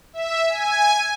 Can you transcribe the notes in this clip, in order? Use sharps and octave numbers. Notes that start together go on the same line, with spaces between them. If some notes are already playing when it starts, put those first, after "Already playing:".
E5
G#5